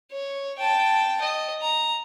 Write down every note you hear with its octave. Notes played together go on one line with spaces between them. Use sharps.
C#5
G5 A5
D#5
A#5